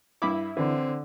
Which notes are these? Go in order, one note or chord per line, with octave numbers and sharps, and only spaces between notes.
G2 E4 B5 D6
D3 E3 C4